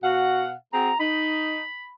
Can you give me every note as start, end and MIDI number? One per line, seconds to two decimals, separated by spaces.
0.03 0.52 47
0.03 0.45 66
0.03 0.52 77
0.03 0.52 78
0.73 0.91 60
0.73 0.91 66
0.73 0.91 68
0.73 0.98 82
0.99 1.63 63
0.99 1.90 83